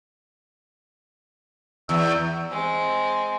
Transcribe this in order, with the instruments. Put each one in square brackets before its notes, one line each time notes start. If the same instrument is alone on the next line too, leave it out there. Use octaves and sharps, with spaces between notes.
[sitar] E2 [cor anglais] E5
[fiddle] G#3 C4